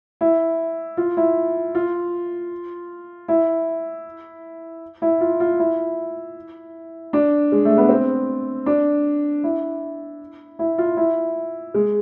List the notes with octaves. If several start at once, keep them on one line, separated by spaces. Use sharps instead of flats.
E4
F4
E4
F4
E4
E4
F4
F4
E4
D4
G#3
A3
B3
C4
D4
E4
E4
F4
E4
G#3